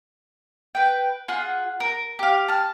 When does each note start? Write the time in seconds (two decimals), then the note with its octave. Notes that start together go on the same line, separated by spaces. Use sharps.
0.75 B4 G5
1.28 F4 G#4 F#5
1.80 A#4
2.19 G4 F5
2.48 A5 F6